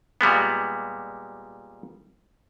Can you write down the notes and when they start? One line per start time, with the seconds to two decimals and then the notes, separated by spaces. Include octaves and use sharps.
0.21 A#2 G3 G#3 B3